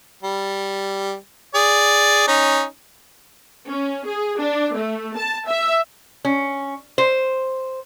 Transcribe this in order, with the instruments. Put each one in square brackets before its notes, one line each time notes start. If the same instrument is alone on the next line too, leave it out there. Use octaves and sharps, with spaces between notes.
[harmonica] G3
G#4 D5
C#4 D#4
[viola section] C#4
G#4
D4
A3
A5
E5
[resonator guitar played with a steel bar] C#4
C5